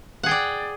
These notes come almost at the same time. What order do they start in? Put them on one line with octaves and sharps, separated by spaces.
F#5 G#4 G5 D5